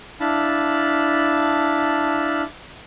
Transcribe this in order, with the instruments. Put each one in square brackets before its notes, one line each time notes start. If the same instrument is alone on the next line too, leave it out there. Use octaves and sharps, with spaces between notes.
[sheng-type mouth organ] D4 E4 F5 A5 B5